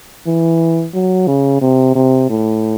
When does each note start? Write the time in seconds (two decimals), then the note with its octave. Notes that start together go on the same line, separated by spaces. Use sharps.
0.27 E3
0.94 F#3
1.27 C#3
1.61 C3
1.95 C3
2.29 A2